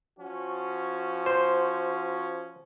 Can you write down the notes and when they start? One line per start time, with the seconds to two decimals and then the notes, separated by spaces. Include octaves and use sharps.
0.18 F3 C#4 F#4
1.26 C5